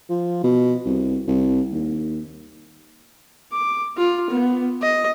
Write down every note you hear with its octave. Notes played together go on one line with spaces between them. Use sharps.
F3
B2
C2
C2
D#2
D6
F4
B3
D#5